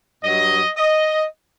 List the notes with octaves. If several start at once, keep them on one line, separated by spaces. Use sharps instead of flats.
G2 F#3 D#5
D#5